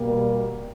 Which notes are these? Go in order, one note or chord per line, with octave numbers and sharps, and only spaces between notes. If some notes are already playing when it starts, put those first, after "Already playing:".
Already playing: B2 G3 A#3